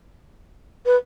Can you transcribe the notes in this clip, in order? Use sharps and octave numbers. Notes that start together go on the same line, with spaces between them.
B4